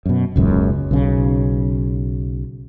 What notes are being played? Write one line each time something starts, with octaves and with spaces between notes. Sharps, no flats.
F#2 B2
D#1 C#2 F#2
B1 C#3